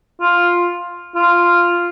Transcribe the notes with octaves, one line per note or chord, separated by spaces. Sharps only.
F4
F4